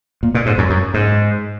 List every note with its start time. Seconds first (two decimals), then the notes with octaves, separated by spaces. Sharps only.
0.23 A#2
0.35 A#2
0.46 G#2
0.58 F#2
0.70 F#2
0.94 G#2